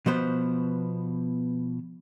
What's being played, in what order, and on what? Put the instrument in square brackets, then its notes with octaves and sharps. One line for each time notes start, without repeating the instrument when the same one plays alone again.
[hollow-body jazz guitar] B2 F3 B3 C5